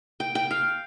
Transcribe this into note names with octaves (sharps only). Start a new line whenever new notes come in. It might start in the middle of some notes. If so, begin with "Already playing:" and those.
G5
G5
F5